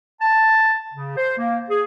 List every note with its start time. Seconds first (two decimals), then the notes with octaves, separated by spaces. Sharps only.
0.21 A5
0.93 C#3
1.17 C5
1.39 A#3
1.70 G#4